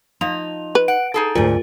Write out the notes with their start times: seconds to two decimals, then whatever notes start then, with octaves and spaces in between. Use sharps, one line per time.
0.21 F3 D#4 F7
0.75 B4
0.88 F#5 D7
1.14 D#4 G#4 A4
1.35 D2 G#2 F4 A#4